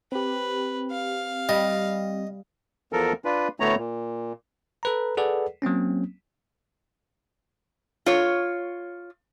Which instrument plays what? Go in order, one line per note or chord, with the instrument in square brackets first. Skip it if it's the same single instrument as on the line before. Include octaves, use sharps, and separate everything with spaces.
[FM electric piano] C4 G4 [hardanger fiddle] B4
[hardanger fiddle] F5
[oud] G3 [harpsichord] D#5
[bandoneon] E2 F3 A4 A#4
D4 F4 B4
D2 A2 A3 B3 C#5 A#5
A#2
[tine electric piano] A4 B4 A#5
G#4 A4 B4 D5 F#5
F#3 A#3 C4 C#4
[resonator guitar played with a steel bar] F4 C#5